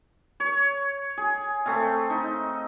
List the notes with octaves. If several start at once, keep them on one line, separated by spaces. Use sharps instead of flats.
C#5
G#4
A3 C4 F5
D#4